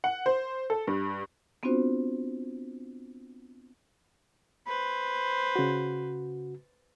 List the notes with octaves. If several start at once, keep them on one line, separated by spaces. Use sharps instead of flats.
F#5
C5
A4
G2
B3 C4 D4 F4 F#4 C5
B4 C5
C#3 F#4